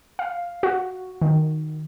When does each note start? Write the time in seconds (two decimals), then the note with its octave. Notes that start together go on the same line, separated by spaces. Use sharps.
0.19 F5
0.63 F#4
1.22 D#3